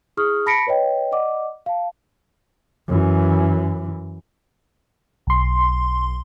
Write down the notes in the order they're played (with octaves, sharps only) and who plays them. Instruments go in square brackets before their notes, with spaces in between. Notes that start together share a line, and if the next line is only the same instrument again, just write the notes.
[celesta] E4 G#4 C#6 D#6 F6
A5 B5 A#6 B6 C#7 D7
B4 C#5 D#5 G5
D5 D#5 F#5 D6
F5 A5
[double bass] F#2 E3
[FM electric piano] B1 C6